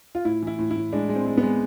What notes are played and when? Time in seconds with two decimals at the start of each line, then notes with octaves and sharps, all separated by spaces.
0.15 F4
0.25 A2 E4
0.42 E3 E4
0.59 A2
0.71 E4
0.76 A2
0.92 G#3 D4
1.09 G#3
1.15 C4
1.26 G#3
1.37 B3
1.43 G#3